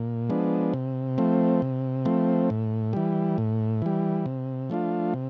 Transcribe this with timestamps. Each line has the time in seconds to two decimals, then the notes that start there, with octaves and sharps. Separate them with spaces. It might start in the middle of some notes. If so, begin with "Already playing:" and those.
Already playing: A#2
0.29 F3 G#3 B3 D4
0.74 C3
1.18 F3 A3 C4
1.62 C3
2.05 F3 A3 C4
2.50 A2
2.93 E3 G3
3.38 A2
3.82 E3 G3
4.26 C3
4.70 F3 A3 D4 F4
5.14 C3